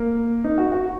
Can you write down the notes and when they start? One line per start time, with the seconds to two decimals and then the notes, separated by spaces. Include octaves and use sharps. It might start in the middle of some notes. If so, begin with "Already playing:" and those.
Already playing: A#3
0.44 D#4
0.58 F#4
0.72 F#4